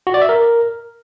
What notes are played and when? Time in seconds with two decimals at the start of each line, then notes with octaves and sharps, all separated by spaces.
0.07 F#4
0.14 D5
0.22 E5
0.29 A#4